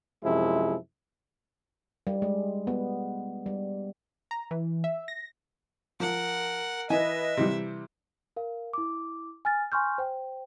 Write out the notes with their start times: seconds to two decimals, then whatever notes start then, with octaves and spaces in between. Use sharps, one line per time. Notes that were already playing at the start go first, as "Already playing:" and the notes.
0.24 F#2 C3 F3 G#3 E4
2.07 G3
2.22 G#3
2.67 B3
3.46 G3
4.31 A#5
4.51 E3
4.84 E5
5.08 A#6
6.00 F3 A#4 F#5
6.90 E3 B4 D#5 E5 G#5
7.37 C3 E3 G3
8.36 A#4 F5
8.73 E4 D6
9.45 G#5 F6 A6
9.72 G#5 C6 C#6 F6 G6
9.98 C5 G5